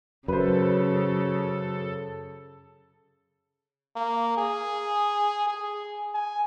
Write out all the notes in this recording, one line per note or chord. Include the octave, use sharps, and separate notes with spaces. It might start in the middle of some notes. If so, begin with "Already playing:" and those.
F#2 C#3 A4 B4 C5
A#3
G#4
G#4
G#5